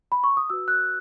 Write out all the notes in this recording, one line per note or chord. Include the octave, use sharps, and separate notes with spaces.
B5
C#6
D#6
F#4 B4 E6
F#6